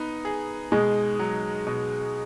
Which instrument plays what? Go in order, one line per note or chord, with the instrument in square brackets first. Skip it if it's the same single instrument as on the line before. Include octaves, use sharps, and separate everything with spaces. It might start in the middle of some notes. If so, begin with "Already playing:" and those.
Already playing: [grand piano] B3 D#4
G#4
[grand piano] B2 [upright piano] G#3
[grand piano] F#3
B2